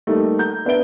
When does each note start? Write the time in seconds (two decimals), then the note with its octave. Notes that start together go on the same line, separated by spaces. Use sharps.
0.07 G3 A3 A#3 D#4 G4
0.39 A#5 G6
0.65 B3 D4 B4 E5 D7 G7